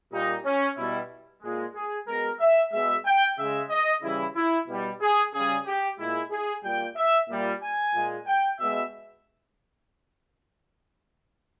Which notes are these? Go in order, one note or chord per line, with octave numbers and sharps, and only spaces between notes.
A#2 G3 D#4
C#4
B2 G3 E4
A#2 G#3
G#4
B2 G#3 A#4
E5
B2 G#3 E5
G5
C#3 G#3 E5
D#5
C#3 E3 G3 E4
E4
B2 G3
G#4
C#3 G3 G#4
G4
A#2 G#3 E4
G#4
A#2 G3 G5
E5
A#2 G3
G#5
A#2 G#3
G5
B2 G#3 E5